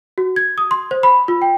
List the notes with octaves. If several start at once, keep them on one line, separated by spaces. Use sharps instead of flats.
F#4
G#6
D#6
C6
C5
B5
F4
G5